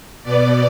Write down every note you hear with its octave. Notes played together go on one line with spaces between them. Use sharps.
B2 B3 D5